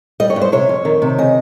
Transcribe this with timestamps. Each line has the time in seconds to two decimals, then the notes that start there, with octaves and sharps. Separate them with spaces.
0.20 G3 D#5
0.30 C#5
0.36 G2
0.41 C5
0.52 C3 C#5
0.69 F2
0.85 D#3
1.02 C3
1.18 C#3 D#5